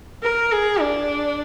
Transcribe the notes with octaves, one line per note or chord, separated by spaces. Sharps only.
A#4
G#4
D4